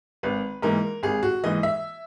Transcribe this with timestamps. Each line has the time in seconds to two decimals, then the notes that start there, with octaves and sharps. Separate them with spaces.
0.23 G#1 B4
0.62 G#2 E3 A#3 A#4
1.03 G#1 G#4
1.23 F#4
1.44 G#2 E3 A#3 D#5
1.63 E5